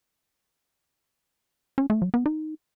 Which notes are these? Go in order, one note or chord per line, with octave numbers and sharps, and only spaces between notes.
C#4
A3
F#3
B3
D#4